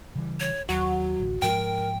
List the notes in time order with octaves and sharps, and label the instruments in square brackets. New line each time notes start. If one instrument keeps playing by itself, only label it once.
[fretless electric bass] C#3 E3 G3
[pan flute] C#5
[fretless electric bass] D#2 [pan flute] F#3 [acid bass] F#4
[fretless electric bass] A1 D2
[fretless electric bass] G#2 F3 G#3 [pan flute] A#4 [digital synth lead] G5